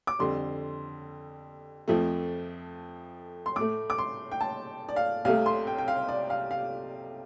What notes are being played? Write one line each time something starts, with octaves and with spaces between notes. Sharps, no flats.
D6
F2 D3 G3 C6
F2 F3 A3
C6
A2 A3 D6
D6
C6
G5
A5
D5
F5
C2 C3 A3 F5
C6
G5
G5
F5
D5
F5
F5